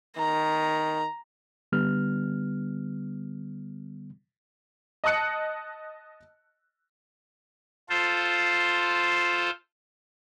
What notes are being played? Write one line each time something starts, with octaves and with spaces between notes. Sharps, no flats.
D#3 A#5
D3 G3 B3 F6
D#5 A5 D#6 F#6 C#7
F4 A4 C5